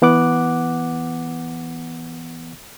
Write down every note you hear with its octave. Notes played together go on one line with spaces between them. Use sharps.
E3 B3 F#5 D6 F#6